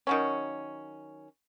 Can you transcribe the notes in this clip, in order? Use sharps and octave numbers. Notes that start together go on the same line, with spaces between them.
D#3 F#3 C#4